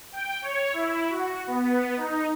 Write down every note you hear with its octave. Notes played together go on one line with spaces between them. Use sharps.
G5
C#5
E4
F#4
B3
D#4